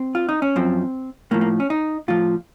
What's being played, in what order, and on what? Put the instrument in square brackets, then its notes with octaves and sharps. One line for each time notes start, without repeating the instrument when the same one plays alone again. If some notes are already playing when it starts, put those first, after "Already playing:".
Already playing: [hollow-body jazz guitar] C4
F4
D#4
C#4
F#2 F3 C4
A2 F3 A#3
A#3
C#4
D#4
A2 F3 F4